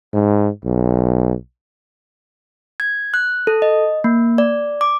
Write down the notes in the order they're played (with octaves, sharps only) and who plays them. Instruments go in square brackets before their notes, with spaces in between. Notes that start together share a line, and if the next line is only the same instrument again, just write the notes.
[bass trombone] G#2
B1
[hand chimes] G#6
F#6
A4
D#5
A#3
D5
D6